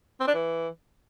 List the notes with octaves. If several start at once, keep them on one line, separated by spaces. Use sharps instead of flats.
C4
D4
E3